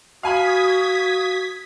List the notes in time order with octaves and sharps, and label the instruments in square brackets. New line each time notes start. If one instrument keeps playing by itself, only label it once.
[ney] F#4 [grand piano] F5 G#5 B5 [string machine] D#6 G#6 B6